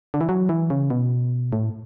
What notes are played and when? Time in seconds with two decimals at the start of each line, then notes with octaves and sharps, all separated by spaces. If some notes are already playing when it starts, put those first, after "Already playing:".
0.14 D3
0.21 E3
0.29 F#3
0.49 E3
0.70 C#3
0.90 B2
1.53 A2